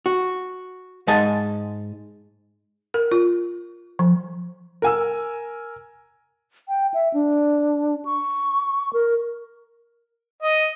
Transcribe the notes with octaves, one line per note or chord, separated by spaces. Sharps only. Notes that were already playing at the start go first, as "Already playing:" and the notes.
F#4
G#2 G#3 D#5 A5
A#4
F4
F3
A#4 G#5 E6
G5
E5
D4
C#6
A#4
D#5